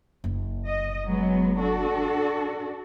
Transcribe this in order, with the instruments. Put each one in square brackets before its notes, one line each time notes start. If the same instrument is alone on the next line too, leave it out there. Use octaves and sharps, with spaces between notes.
[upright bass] F#1
[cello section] D#5
F#3 G#3 B3
D4 F#4 A4